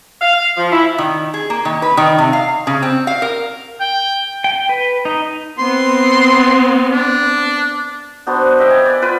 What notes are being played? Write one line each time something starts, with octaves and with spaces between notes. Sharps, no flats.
F5
F3
E4
D#3
G#4
A#3
D#3
B4
D#3
C3
F5
C#3
C4
F5
A#4
G5
G5
B4
D#4
B3 C4 C6
D4
B3 D4 F#4 C5
D#5 E5 G5
G#5
D5 F#5
F4 B4